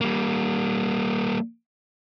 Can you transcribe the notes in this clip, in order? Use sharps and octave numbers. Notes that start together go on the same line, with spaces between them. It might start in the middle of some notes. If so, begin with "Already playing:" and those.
G3 A#3